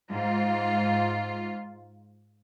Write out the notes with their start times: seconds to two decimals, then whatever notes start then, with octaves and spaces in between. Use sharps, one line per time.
0.11 G#2 F4